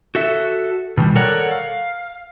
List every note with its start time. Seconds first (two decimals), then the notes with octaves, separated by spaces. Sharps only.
0.15 F#4 A4 E5
0.97 B2 D#3 E3 G3
1.15 A4 A#4 C#5 D5 F#5
1.51 F5